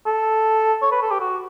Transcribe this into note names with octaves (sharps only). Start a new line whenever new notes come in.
A4
C#5
B4
A4
G4
F#4